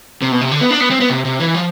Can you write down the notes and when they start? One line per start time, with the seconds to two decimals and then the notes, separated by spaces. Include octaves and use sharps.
0.22 C3
0.32 B2
0.41 C3
0.51 D3
0.61 B3
0.70 D4
0.81 B3
0.90 C4
1.00 B3
1.10 C3
1.25 C3
1.39 E3
1.54 F3